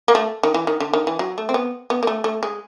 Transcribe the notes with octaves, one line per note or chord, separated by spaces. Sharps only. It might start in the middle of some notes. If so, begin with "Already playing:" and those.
A#3
A3
D#3
E3
D#3
D3
D#3
E3
F#3
A3
C4
B3
B3
A#3
A3
A3
G#3